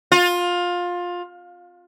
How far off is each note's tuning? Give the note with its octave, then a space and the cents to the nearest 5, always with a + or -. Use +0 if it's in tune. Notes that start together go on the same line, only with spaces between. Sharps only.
F4 +20